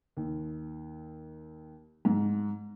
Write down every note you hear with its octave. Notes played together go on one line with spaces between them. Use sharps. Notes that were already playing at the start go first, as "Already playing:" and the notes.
D#2
G#2